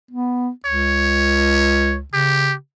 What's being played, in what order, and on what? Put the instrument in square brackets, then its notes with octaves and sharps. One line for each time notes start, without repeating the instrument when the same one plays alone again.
[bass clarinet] B3
[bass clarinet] C#2 [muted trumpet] C#5
[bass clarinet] C#3 [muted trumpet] G4